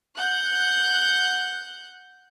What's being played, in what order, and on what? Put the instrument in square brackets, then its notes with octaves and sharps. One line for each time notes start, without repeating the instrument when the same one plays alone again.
[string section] F#5 F#6 G6